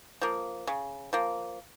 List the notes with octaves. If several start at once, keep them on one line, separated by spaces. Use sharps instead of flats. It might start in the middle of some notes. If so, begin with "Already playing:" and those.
F3 A#3
C#3
F3 A#3